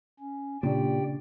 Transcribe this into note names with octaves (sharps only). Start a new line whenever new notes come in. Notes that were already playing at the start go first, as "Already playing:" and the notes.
C#4
A#2 C#3 D4 G4 D5 G5